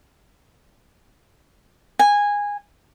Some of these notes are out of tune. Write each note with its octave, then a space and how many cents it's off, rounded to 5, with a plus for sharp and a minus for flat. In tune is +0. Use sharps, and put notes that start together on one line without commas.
G#5 -15